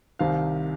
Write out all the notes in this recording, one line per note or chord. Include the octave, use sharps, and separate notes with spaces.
C2 C3 D#3 F5